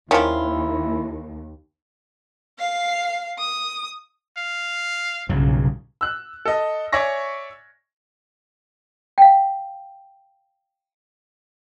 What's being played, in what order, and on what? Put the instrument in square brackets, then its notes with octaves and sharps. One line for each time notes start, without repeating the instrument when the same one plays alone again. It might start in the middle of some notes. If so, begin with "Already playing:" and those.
[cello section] D#2 [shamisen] D#3 F3 [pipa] G3 C#4 F4 [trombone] E4
[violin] F5 C7
D#6
[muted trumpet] F5
[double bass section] B1 C#3 [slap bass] G2 A#2 F#3
[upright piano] E6 F#6
A4 D#5
C#5 D5 E5 G#5 C#6 A#6
[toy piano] F5 G5